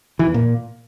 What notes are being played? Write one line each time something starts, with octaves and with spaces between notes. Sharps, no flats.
E3
E2
A#2